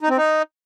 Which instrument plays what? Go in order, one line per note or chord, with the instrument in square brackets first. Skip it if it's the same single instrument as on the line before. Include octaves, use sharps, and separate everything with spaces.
[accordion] D#4
C4
D#4